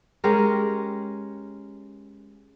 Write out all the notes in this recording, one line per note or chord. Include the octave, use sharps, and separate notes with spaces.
G#3 C#4 G4 A#4